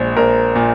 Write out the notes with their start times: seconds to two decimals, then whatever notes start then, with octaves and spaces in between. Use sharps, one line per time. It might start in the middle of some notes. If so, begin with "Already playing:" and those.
Already playing: A#1 G#3
0.17 A#1 A#4
0.56 A#2